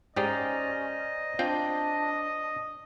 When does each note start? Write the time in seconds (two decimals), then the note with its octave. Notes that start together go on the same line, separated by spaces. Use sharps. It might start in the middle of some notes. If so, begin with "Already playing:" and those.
0.16 G#2 C#4 G4 G#4 C5 D5 D#5 A#5
1.39 C4 D4 F4 G5